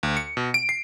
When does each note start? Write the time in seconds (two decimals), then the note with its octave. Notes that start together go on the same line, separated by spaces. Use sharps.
0.03 D2
0.17 C#7
0.37 B2
0.54 D7
0.69 C7